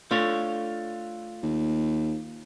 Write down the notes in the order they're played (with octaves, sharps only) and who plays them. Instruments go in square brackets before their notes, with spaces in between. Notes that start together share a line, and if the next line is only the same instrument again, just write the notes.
[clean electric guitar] A3 D4 C#5 [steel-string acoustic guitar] F4
[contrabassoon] D#2